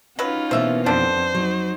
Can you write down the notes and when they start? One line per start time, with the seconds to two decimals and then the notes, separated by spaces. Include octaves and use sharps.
0.19 F#3 C#4 D#4 F4 B4
0.51 B2 E3 A#3 C5 E5
0.86 F2 D3 B3 D4 C5
1.35 F#3 D#4